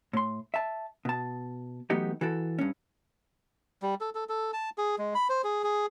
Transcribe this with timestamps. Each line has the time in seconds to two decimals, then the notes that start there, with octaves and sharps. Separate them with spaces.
0.13 A2 C6
0.54 E5 A5
1.05 B2 A5
1.90 E3 F#3 A3 B3 D#4 G4
2.21 E3 F#4 A4
2.59 G2 C#4
3.82 G3
4.01 A4
4.15 A4
4.29 A4
4.53 A5
4.78 G#4
4.98 G#3
5.15 B5
5.29 C5
5.44 G#4
5.64 G#4